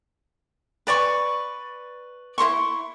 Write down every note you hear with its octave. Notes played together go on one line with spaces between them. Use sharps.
B4 D5 G#5 C#6
E4 C5 C6 C#6